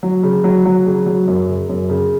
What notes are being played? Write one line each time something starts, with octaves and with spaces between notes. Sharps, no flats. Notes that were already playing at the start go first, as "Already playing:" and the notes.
F#3
C#3
F#3
F#3
C#3
F#3
F#2
C#3
F#2
C#3